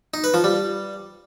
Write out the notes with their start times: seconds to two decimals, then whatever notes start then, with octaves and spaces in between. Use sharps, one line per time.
0.14 D#4
0.24 B4
0.34 F3
0.44 G3